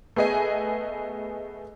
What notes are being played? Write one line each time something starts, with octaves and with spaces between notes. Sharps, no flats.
A3 B3 G#4 D#5 G#5